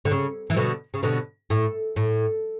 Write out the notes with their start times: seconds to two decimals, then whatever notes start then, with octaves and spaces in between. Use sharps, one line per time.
0.05 D3
0.11 C#3
0.50 E3
0.56 B2 D3
0.94 C#3
1.03 B2 D3
1.50 A2
1.96 A2